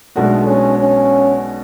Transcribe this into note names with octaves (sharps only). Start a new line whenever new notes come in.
B1 B2 G#3 A3 D4 F#4
C#4
C#4